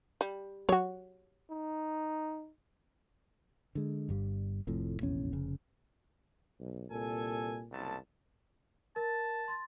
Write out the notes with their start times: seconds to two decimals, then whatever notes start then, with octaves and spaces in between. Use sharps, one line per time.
0.21 G3
0.69 F#3 F#4 C#5
1.50 D#4
3.75 D3 G#3
4.09 G1 G2 G3
4.67 F1 F2 A2
5.00 F1 A#1 E2 C#4
5.33 F1 C#3
6.60 B1
6.91 C2 A#2 A4 G#5
7.72 F#1 C2 A5
8.96 A#4 A5 A6
9.48 C6 A6